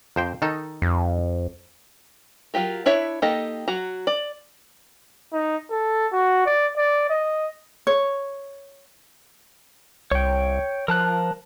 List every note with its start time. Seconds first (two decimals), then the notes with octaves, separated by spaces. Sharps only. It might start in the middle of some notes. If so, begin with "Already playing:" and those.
0.16 F2 C5 G5
0.42 D#3 D#4 A4
0.82 F2
2.54 F#3 A#3 F4 G4 A#4
2.86 D4 E4 C#5 E5
3.22 A#3 D#4 G4 A4 D#5
3.68 F#3 F#4 A#5
4.07 D5
5.33 D#4
5.70 A4
6.13 F#4
6.46 D5
6.77 D5
7.10 D#5
7.87 C#5
10.12 C2 C#5 G5
10.88 F3 A#4 A5 F#6